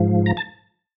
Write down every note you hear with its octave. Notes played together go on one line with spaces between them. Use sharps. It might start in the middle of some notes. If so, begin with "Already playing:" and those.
Already playing: G#2 F3
A#5
A5